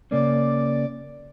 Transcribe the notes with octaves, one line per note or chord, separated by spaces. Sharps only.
C#3 A#3 C#4 D5